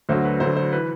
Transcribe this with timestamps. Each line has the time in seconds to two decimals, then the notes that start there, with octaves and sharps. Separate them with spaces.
0.09 D2 D3 F#3 C5
0.25 B4
0.40 D2 D3 F#3 C5
0.57 C5
0.72 E3 B4